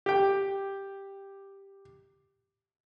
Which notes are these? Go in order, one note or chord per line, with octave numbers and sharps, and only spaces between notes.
G4 G5